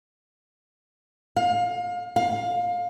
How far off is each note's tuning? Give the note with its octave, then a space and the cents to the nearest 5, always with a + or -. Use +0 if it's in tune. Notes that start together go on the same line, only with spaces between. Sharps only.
F5 +30
F5 +25